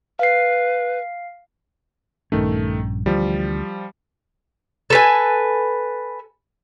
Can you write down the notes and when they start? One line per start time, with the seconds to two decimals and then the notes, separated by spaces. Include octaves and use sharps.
0.19 B4 F5 C7
2.32 A#1 G2 D#3 A3 C#4
3.06 D2 E3 F3 G3
4.90 A4 B4 G#5